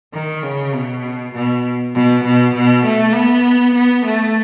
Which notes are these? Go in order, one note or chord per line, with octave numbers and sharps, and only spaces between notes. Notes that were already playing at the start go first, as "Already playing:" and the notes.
D#3
C#3
B2
B2
B2
B2
B2
A3
B3
B3
A3